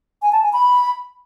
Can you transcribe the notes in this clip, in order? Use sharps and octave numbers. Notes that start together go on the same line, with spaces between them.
G#5
A5
G#5
B5